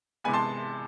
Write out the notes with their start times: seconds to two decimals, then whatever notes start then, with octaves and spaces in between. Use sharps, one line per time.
0.24 C3 E3 G#3 B3 G#5 B5
0.34 A5 C6